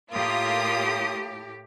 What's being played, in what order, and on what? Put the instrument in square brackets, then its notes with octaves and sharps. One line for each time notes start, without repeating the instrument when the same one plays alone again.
[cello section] A2 G4 [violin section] A#3 F4 D#6